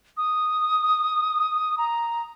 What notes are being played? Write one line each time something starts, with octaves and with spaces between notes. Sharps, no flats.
D#6
A#5